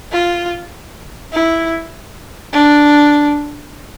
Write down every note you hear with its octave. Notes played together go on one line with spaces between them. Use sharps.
F4
E4
D4